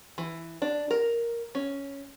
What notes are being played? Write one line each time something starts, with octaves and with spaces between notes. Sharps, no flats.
E3
D4
A#4
C#4